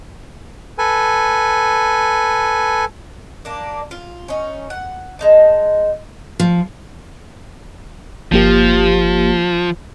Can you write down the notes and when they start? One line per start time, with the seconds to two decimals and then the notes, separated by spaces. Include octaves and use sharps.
0.78 A4 B4 G#5
3.45 A#3 D4
3.91 F4
4.28 C#4 D#4
4.70 F#5
5.19 G#3 D#4 A5
6.40 F3
8.32 G1 F3 A#3 G4